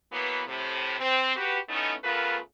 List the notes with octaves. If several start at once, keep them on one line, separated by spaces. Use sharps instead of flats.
E3 F#3 A#3 B3
A2 C3
C4
F#4 G4 B4
A2 A3 B3 C#4 D#4 D#5
C#3 A3 B3 F4 A#4 B4